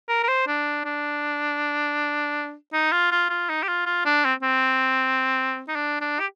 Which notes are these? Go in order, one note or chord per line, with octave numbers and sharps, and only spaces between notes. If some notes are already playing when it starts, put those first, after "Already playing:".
A#4
A#4
C5
D4
D4
D#4
F4
F4
F4
D#4
G4
F4
F4
D4
C4
C4
D#4
D4
D4
G4